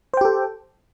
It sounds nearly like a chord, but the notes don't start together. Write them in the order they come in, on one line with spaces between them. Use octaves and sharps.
C5 G5 G4 A4